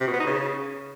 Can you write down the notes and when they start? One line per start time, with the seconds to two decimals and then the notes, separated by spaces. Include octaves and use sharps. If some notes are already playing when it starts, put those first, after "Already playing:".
0.01 C3
0.07 B2
0.14 B3
0.20 D#4
0.26 C#3